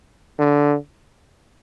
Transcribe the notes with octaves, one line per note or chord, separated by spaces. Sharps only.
D3